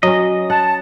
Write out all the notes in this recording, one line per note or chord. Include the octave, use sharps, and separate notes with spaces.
F#3 C#4 D#5
F#5 A5